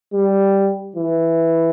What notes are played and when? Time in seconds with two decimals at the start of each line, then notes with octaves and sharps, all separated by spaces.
0.13 G3
0.96 E3